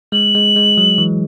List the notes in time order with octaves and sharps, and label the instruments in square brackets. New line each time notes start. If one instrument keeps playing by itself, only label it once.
[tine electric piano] G#3 [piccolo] F#7
[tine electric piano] G#3
G#3
F#3
E3